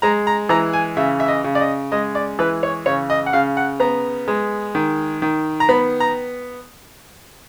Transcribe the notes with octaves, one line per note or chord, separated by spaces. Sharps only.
G#3 A#5
A#5
E3 A#5
G#5
C#3 E5
E5
D#5
C#3
D5
D#5
G#3 D#5
D5
E3 B4
C#5
C#3 C#5
D#5
F#5
C#3 F5
F#5
B3 A#5
G#3
D#3
D#3
A#5
B3 B5
A#5